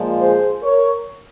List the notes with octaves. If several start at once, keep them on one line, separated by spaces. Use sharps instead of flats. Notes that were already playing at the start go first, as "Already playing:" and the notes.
Already playing: A#2 F3 G#3
G#4 C5
A#4 C#5